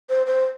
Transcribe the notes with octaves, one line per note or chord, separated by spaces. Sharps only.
C5
C5